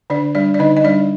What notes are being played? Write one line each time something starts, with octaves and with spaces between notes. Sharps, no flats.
D3 D4 D5
G3 D4 D5
D5
D3 D#4 D#5
D#5
G3 D4 D5